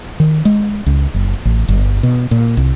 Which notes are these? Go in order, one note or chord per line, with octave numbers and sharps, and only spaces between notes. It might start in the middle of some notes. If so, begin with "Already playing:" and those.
D#3
G#3
C#2
F#1
A1
G1
B2
A#2
C2